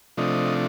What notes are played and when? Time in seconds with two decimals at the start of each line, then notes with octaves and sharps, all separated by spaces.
0.17 C3 F3 A3 D4 D#5